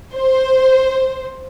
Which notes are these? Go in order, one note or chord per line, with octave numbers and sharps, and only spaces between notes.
C5